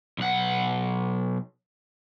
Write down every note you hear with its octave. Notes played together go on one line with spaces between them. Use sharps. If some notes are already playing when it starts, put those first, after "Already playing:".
B1 F#5